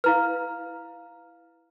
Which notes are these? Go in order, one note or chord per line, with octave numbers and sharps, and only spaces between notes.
E4 B4 F5 A#5 F6